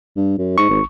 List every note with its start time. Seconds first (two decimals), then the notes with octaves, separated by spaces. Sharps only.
0.16 G2
0.38 F#2
0.58 G#2 C#6
0.69 G#1